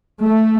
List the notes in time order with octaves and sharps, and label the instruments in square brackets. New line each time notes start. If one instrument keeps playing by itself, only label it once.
[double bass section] A3